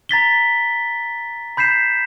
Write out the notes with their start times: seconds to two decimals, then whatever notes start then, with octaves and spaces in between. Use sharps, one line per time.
0.09 A#5 A6 B6 G7
1.57 B5 G6 B6 C7 E7